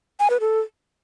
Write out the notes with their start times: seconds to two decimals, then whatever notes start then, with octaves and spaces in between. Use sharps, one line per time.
0.20 G#5
0.30 B4
0.40 A4